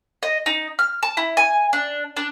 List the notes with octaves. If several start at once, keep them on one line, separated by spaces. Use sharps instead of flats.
D#5
D#4
F6
A5
E4
G#5
D4
D4